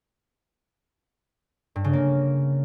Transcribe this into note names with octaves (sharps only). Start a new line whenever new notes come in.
G2
C#3
A#3